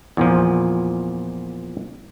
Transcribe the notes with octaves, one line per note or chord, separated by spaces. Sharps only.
E2 A#2 F3